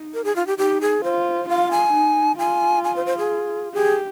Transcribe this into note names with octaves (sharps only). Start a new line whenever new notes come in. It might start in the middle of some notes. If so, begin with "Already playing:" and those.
Already playing: D#4
A#4
G#4
F4
G4
D#4 G4
G#4
F4 C5
F4 F5
G#5
D#4
F4 G#5
G#5
C5
C5
G#4
G4 G#4